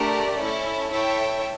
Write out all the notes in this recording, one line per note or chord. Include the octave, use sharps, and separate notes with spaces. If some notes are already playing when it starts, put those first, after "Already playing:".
Already playing: A3 D4 G4 A#4 D5
C#4 E4 A4
E4 A4 C#5 E5 G5